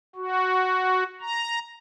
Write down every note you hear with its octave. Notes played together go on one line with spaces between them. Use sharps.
F#4
A#5